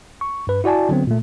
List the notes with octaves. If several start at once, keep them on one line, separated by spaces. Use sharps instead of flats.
C#6
G2 B4
E4 F#4 D5 G#5 A5
D3 F#3 B3 C4
A#2 A3